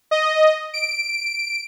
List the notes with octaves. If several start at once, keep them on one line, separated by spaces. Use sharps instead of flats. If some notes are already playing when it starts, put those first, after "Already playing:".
D#5
D7